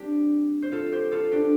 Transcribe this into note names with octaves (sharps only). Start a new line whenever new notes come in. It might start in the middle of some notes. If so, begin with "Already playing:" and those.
Already playing: G3 C4 D4 G4
C5
F4 A4
G4 C5
F4 A4
D4 G4